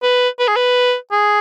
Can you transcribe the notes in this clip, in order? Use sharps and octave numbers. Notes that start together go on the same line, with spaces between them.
B4
B4
G#4
B4
G#4